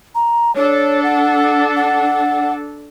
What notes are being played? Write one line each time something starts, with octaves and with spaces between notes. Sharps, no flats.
A#5
D4 A4 C#5
F#5
F#5